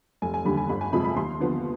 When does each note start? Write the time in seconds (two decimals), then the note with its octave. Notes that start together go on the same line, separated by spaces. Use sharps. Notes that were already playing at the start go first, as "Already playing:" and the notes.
0.22 F1 G#5
0.34 G#5
0.45 D#2 D3 G3 B5
0.57 G#5
0.69 G1 B5
0.81 G#5
0.92 F2 C3 F3 G#3 B5
1.04 B5
1.16 D#2 C6
1.40 D3 F3 B3